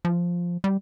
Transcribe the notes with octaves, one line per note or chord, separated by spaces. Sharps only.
F3
G3